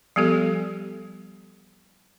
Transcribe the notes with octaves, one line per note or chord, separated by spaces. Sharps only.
F3 G3 B3 G4 A4